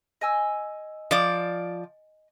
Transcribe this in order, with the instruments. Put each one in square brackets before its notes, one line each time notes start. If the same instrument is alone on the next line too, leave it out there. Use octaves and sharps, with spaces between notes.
[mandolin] D#5 G#5 E6
[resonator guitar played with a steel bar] F3 D5